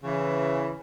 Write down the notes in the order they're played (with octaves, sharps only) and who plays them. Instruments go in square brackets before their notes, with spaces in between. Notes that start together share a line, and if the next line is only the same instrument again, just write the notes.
[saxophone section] C#3 E3